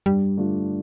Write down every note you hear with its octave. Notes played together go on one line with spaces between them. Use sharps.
G2 G3
D3 A3 D4 F4